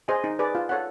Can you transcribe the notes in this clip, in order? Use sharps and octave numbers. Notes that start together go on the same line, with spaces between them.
G#4 C5 D#5 G#5
D#4
G#4 B4 D5
F4
A4 C#5 F#5